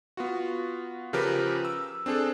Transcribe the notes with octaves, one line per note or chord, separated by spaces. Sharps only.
B3 F4 F#4
C#3 F3 G4 A#4 B4
E6
C4 D4 G#4 A4